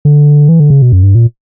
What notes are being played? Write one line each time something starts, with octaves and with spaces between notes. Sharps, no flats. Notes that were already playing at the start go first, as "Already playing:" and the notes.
D3
E3
D3
C#3
B2
F#2
G2
A#2